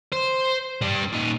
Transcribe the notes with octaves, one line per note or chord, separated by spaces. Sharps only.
C5
G3 D4
A#2 D#4